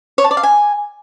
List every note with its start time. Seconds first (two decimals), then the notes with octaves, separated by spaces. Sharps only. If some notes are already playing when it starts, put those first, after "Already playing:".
0.18 C#5
0.24 A5
0.31 D5
0.37 F5
0.43 G#5